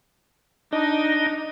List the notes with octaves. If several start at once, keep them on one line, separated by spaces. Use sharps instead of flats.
D4 D#4 D#5